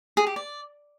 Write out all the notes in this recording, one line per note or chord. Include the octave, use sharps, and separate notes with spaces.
G#4
G4
D5